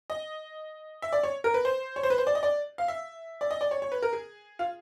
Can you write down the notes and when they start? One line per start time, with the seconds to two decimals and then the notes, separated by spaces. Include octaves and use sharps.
0.10 D#5
1.02 E5
1.13 D5
1.23 C#5
1.44 A#4
1.54 B4
1.65 C5
1.96 C#5
2.03 C5
2.10 B4
2.18 C5
2.27 D5
2.35 D#5
2.43 D5
2.78 F5
2.88 E5
3.41 D5
3.51 D#5
3.61 D5
3.71 C#5
3.82 C#5
3.92 B4
4.03 A#4
4.13 G#4
4.59 F4